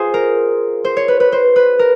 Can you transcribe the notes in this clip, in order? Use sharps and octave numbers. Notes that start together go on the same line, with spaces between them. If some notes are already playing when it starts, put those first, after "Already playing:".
Already playing: F4 G#4 C5
A#4
C5
C#5
B4
B4
C5
B4
A#4